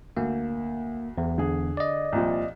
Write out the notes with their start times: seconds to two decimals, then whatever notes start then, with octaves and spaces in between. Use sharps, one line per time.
0.17 D2 A#3
1.18 E2
1.38 D3 G#4
1.77 D5 D#5
2.12 C2 A#2 F3